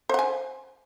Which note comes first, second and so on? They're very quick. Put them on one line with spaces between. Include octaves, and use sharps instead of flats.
C5 F#5 G#5